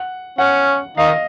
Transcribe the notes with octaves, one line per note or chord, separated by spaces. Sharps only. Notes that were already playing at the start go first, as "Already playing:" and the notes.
Already playing: F#5
C#4 F#5
D#3 D#4 F5
D#5